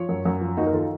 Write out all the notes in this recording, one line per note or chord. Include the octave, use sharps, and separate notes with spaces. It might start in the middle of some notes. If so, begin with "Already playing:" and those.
Already playing: F3 C#5
F#2
F#2
F3
D#2 D#4 F#4
A#4
D#3 F4 A4